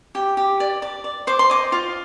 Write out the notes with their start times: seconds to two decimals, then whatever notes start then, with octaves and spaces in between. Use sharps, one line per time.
0.15 G4
0.37 G4
0.60 D5
0.82 D5
1.04 D5
1.27 C5 D6
1.39 C6
1.50 D#5 D6
1.72 F4